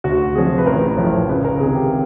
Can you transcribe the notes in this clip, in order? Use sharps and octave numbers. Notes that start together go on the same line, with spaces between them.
D2 F#4
C3 F3 G#4
B4
A1 A#4
A2 F3
C#2 B4
A#4
C3 D#3 G#4
G4